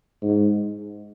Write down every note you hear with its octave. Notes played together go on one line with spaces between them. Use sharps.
G#2